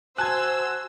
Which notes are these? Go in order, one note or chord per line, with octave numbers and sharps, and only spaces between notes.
F#4 C5 G#5 A5 E6 F#6 G#6